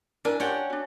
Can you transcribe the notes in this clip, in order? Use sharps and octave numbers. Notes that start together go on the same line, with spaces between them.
D4 E4 A#4 G#5
C#4 F4 G4 F#5 G5
D4 F#4